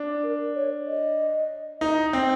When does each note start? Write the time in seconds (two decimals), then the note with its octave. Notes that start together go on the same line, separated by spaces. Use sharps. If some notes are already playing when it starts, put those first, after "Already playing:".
Already playing: D4
0.23 A#4
0.56 C#5
0.86 D#5
1.81 D#4
2.13 C4